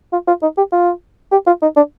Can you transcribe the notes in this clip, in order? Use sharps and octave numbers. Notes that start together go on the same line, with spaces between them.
F4
F4
D#4
G4
F4
G4
F4
D#4
D4